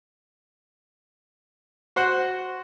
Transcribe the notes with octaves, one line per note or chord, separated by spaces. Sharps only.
F#4 C5 F#5